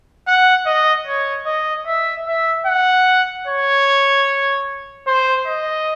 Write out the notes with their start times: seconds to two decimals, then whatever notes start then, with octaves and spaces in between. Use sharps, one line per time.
0.27 F#5
0.66 D#5
1.07 C#5
1.46 D#5
1.87 E5
2.27 E5
2.66 F#5
3.47 C#5
5.07 C5
5.46 D#5